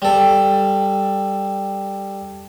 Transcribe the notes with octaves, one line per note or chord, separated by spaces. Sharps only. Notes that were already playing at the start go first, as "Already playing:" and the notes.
G3 A4